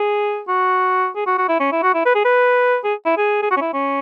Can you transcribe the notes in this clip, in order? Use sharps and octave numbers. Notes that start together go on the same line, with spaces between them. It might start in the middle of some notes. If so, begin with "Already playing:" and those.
Already playing: G#4
F#4
G#4
F#4
F#4
E4
C#4
E4
F#4
E4
B4
G#4
B4
G#4
E4
G#4
G#4
F#4
C#4
E4
C#4